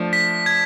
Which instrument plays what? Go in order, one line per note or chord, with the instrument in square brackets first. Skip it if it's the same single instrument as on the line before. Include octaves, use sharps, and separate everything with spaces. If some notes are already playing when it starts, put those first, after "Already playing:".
Already playing: [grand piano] F3 A3 D4
[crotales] B6
G#6